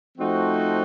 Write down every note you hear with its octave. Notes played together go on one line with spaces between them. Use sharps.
F3 A3 C4 D#4 F#4